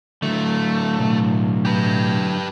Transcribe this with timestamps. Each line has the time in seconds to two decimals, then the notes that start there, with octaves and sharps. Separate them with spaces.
0.22 D3 F#3 A3
0.99 B1 A2
1.65 G4 B4